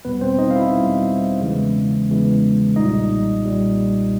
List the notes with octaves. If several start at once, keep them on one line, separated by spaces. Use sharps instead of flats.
E2 B2 G3 B3 B4
C4 C5
D#4 D#5
F5
E4 E5
E2 B2 G3
E2 C#3 E3 G#3
E2 C#3 E3 G#3
B1 A#2 G3 D#4 D#5
B1 A#2 G3